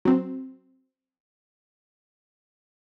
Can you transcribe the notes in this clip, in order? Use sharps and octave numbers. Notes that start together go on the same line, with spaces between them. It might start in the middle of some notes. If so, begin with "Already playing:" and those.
F#3 C4